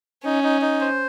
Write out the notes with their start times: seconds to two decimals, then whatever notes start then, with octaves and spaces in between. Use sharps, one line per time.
0.24 C#4 D#4
0.44 D#4
0.61 D#4
0.81 C5